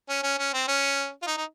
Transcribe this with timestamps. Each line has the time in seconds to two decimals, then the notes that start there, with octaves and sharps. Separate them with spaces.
0.09 C#4
0.23 C#4
0.39 C#4
0.54 C4
0.68 C#4
1.22 F4
1.27 D#4
1.37 D#4